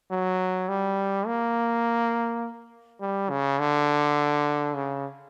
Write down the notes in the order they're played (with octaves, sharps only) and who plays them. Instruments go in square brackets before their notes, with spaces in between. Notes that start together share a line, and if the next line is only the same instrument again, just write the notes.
[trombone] F#3
G3
A#3
G3
C#3
D3
C#3